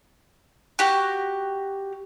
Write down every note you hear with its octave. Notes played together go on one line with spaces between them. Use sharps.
F#4 G4